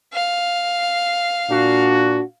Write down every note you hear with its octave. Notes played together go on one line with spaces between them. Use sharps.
F5
A#2 D4 F#4